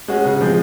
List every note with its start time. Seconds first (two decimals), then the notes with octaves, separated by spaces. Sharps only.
0.08 G#3 C#4 F#4
0.26 C#3
0.41 F3 G#3 C4